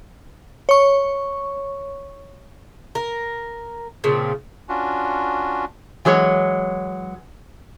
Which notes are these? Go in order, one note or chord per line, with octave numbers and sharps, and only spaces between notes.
C#5 C#6
A#4
A#2 C#3 F3 C4
C#4 D4 F4 F#4
E3 F#3 G#3 C#5